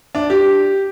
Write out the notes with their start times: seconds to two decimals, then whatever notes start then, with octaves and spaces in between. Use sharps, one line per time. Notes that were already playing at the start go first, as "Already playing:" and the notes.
0.15 D4
0.30 G4